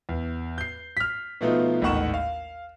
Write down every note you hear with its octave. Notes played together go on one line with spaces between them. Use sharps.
E2
G6 C7
F6 B6
B2 F3 A3 B3 D#4 F4
A1 D#2 G#2 F#5 C#6 E7
F5